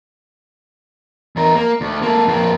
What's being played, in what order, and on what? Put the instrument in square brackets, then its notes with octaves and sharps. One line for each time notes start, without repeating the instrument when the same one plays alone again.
[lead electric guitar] E2 A#4
A#3
D2
A#3 A4
F2 A#3